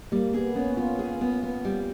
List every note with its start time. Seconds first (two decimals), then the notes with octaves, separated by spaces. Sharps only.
0.12 G3 A#3
0.34 B3 G#4
0.55 B3 C#4
0.77 B3 F4
0.99 G#4
1.21 B3
1.43 B3
1.65 G3